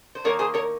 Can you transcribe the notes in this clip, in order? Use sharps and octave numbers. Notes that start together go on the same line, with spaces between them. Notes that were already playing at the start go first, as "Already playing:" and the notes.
C5
D#3 A#3 D#4 A#4 C#5
G#4 C5
A#4 C#5